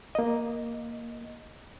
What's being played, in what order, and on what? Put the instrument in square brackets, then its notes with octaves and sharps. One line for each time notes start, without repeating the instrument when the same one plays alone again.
[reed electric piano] A#3 D#5